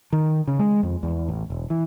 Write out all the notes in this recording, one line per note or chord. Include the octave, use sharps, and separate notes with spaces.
D#3
C#3
G#3
F2
E2
A1
E1
E3